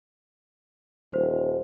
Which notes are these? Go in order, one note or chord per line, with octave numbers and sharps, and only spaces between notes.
D#1 C5